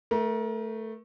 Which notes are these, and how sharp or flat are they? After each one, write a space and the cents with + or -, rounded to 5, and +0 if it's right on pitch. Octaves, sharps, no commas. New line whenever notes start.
A3 +0 A#4 +30